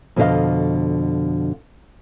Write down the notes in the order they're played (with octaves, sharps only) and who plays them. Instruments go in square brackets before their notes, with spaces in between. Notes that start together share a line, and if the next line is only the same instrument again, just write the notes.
[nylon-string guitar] F2 B2 D3 G4 D#5 F5